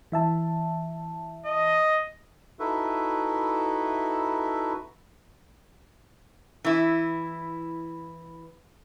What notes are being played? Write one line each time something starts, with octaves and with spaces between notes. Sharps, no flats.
E3 E5 A5
D#5
D#4 E4 F#4 A4 B4 E5
E3 E4